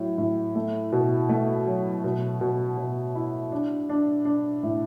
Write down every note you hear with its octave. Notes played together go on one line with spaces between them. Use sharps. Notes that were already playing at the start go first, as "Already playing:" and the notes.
Already playing: A2 F#3
A2
A3
B2
A3
F#3
B2
B2
B2
E4
D4
D4
D4
A2